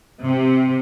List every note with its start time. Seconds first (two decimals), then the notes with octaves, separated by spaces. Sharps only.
0.24 C3